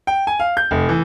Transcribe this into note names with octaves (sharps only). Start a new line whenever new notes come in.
G5
G#5
F5
G6
F1
E3